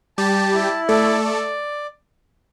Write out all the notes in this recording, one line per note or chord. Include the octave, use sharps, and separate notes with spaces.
G3 G4 A5
E4
A3 A4 D5
D5